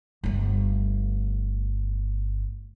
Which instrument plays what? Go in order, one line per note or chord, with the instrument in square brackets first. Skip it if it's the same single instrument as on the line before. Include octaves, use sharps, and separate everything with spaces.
[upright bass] G1 A3